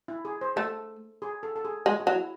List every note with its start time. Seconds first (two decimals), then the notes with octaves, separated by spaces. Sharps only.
0.08 E4
0.25 G#4
0.41 C5
0.56 A3 A4
1.22 G#4
1.43 A4
1.56 A4
1.65 G#4
1.86 G#3 G#4
2.00 F#4
2.07 F#3
2.13 E4